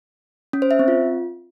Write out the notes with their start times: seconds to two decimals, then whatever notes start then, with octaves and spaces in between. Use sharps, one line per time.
0.53 C#4
0.62 C5
0.71 E5
0.79 C4
0.88 F4